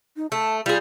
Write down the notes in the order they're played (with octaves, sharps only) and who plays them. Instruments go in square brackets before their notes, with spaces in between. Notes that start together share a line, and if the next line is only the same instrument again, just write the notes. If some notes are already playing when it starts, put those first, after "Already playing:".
[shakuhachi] D#4
[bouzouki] A3 [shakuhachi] A5
[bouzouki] G3 G#4 [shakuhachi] F4